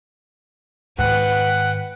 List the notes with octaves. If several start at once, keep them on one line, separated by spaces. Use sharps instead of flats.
G#2 D#3 B4 F#5 G5